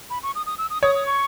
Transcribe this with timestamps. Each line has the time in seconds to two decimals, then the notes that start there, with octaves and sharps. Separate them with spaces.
0.10 B5
0.23 C#6
0.35 D#6
0.46 D#6
0.58 E6
0.70 D#6
0.83 C#5 D#6
0.95 D#6
1.06 C#6